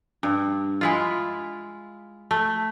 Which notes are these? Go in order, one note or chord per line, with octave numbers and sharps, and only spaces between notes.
G2
G#3 E4 F4
A3